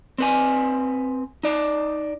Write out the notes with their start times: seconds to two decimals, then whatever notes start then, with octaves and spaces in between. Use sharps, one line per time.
0.18 C4 B4 G#5
1.43 D#4 D5